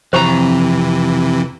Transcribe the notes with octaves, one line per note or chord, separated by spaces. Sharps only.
F2 C3 E3 G4 C5 G5 A#5 C#6